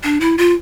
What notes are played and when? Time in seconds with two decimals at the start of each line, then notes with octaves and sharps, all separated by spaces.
0.03 D4
0.20 E4
0.38 F4